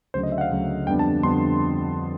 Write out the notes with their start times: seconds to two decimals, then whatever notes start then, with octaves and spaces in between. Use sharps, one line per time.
0.14 D2 C#3 F#3 C5
0.23 D#5
0.32 E5
0.38 F#5
0.41 F5
0.51 D2 C#3 F#3
0.87 F2 D3 G3 B3 D4 G5
0.99 A5
1.23 F2 D3 G3 B3 D4 C6